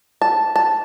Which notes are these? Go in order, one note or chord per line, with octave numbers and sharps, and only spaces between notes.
A5
A5